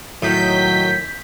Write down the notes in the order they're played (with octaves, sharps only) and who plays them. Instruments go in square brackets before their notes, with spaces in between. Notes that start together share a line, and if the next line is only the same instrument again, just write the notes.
[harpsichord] A2 [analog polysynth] D#3 G6 B6 [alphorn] F#3